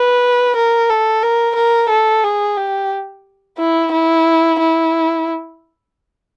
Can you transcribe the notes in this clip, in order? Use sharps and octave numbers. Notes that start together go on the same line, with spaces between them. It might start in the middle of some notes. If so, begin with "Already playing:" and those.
Already playing: B4
A#4
A4
A#4
A#4
A4
G#4
G4
E4
E4
E4